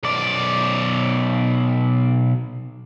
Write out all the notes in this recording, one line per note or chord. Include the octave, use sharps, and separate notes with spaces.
B1 D5